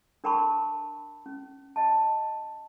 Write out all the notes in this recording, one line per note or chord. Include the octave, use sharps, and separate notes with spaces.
D4 A#4 G5 A5 B5 C#6
C#4
D#5 A5